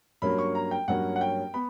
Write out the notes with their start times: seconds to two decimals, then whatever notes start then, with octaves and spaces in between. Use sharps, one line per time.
0.22 G2 F#3 A#3 C#4 B5
0.38 C#6
0.55 A#5
0.71 G5
0.88 G2 F#3 A#3 C#4 F#5
1.16 F#5
1.21 G5
1.54 B3 B5